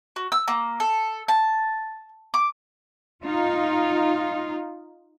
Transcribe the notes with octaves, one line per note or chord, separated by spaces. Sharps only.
F#4
E6
A#3
A4
A5
D6
D#4 F4